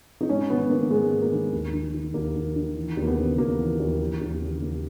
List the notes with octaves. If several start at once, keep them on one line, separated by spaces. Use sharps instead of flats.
D#4
G#2 C#4
D#3 B3
D#3 A#3
G#2 G#3
G#2
A#3
D#3
D#2
D#3
D#3
D#2 A#3
D#2
D#3
E3
D#2
A#3
B3
C#3
D#2 A#3
E3
D#2
E3
D#2
C#3
D#2